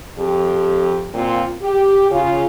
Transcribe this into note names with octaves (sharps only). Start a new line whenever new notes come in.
F2 G4
A#2 C4 F4
G4
C#3 F4